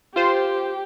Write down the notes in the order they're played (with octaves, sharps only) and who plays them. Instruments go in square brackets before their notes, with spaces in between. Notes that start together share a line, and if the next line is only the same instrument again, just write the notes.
[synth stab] F4 C5 [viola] G4